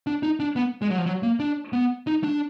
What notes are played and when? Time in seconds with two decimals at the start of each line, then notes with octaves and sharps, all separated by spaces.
0.07 D4
0.23 D#4
0.40 D4
0.56 B3
0.82 G#3
0.90 F#3
0.98 F3
1.06 F#3
1.23 A#3
1.40 D4
1.73 B3
2.07 D#4
2.23 D4